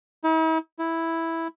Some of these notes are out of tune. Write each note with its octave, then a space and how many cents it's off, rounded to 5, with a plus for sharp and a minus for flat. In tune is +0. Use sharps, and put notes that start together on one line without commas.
E4 -45
E4 -5